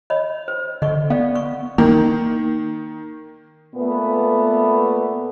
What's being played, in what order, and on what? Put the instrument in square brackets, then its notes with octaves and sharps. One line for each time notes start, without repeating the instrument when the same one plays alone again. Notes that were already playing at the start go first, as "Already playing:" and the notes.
[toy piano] C#5 D#5 B5
C5
[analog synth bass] D3 [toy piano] D#5 C#6
[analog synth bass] B3 [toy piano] D5 F5
[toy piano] C#6
[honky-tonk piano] D#3 [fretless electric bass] A#3
[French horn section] A#2 A3 B3